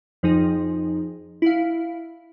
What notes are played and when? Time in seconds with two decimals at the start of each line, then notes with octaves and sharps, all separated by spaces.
0.23 F2 F3 D#4 G#4
1.42 E4 F5